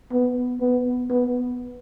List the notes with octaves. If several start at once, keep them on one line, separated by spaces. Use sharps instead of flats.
B3
B3
B3